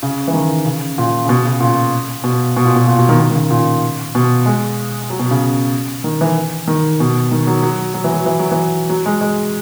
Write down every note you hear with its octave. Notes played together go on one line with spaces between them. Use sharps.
C#3
E3
D#3
C#3
A#2
C#3
B2
C#3
A#2
B2
B2
A#2
B2
A#2
B2
D#3
D#3
D#3
C#3
A#2
B2
G#3
F#3
B2
C#3
D#3
E3
D#3
B2
D#3
F#3
F#3
F#3
E3
F#3
E3
F#3
E3
F#3
G#3
G#3